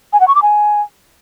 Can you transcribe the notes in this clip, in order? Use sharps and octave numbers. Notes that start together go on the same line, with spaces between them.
G#5
F#5
C#6
D6
G#5